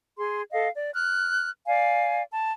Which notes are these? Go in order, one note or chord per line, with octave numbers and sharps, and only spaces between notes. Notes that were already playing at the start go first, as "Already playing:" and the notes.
G#4 C6
A4 D#5 F5
D5
F6 F#6
D5 F5 G#5
A5